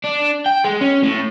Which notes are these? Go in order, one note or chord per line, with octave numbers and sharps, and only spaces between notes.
D4
G5
G#3
C#4
A2